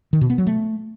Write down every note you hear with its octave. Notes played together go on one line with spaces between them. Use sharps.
D#3
B2
B3
F#3
A3